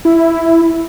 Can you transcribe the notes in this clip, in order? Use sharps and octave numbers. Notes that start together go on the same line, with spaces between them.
E4